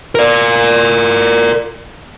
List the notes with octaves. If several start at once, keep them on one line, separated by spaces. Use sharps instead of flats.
A#4 D5